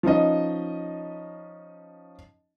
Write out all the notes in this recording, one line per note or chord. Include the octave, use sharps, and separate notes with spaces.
F3 C#4 D#4 D#5